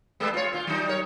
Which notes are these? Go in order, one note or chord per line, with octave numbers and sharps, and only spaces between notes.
G3 G#3 B3
F4 C#5
A#2 F4
F#3 G3 D#4
A#4 C#5